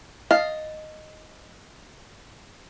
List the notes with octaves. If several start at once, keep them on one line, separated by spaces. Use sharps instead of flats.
D#5 F5 A5